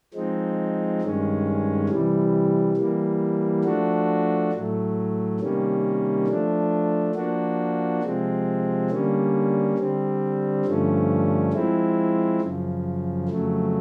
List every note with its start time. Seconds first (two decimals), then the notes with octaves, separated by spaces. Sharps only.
0.14 F3 G#3 C4 D#4
1.01 G2 D#3 G#3 C#4
1.89 C3 E3 G3
2.77 E3 G3 A#3
3.64 F3 A3 D4 F#4
4.52 A2 F#3 A3
5.39 C3 D#3 G3 A#3 C#4
6.27 F3 A3 D4
7.15 F3 A#3 D4 F#4
8.02 C3 F3 G#3 C4
8.90 D3 G3 A#3 C#4
9.78 D3 G3 C4
10.65 G2 D3 F3 A3 C#4
11.53 F3 G#3 C4 E4
12.41 F#2 C#3 F3
13.28 F2 C#3 F#3 A3